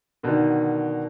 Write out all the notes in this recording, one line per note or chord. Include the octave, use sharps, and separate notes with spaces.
B2 D3 D#3